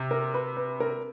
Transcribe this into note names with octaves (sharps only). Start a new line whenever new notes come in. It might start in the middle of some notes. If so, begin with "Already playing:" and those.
Already playing: C3
A#4
B4
B4
A#4